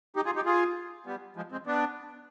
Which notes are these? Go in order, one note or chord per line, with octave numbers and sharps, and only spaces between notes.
D#4 G4
F4 G#4
D#4 G4
F4 G#4
G3 B3
F3 G#3
G#3 C4
B3 D4